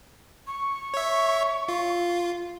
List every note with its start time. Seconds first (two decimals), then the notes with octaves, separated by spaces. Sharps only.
0.47 C#6
0.94 C#5 E5
1.68 F4